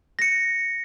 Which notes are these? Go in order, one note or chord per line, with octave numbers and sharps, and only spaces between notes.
A#6 C#7